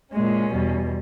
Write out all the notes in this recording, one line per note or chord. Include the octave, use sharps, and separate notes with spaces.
A#2 G#3 C#4
E2 B2 G3